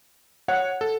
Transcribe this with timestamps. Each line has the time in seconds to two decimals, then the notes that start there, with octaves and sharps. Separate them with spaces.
0.48 C#5 F#5
0.81 A4